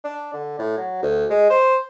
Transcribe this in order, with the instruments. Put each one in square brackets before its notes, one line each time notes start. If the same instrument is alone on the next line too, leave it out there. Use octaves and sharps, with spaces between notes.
[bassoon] D4
D3
A2
F#3
D2
G#3
C5